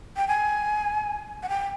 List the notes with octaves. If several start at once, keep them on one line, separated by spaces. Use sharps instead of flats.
G5
G#5
F#5
G5